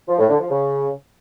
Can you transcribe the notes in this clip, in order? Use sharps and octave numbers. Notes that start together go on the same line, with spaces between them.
F3
A2
D3
F3
C#3